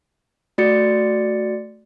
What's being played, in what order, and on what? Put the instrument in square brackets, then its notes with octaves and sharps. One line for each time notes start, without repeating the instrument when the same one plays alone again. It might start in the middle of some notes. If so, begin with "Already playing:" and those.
[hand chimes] A3 F#4 D5 A6 C#7